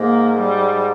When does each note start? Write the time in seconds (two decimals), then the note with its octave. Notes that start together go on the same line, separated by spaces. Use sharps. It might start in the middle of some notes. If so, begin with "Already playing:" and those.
Already playing: G#2 A#3
0.39 G3